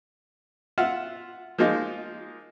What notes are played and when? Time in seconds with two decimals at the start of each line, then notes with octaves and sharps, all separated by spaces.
0.78 F4 E5 F#5 F6
1.58 F3 G#3 A#3 D#4 F4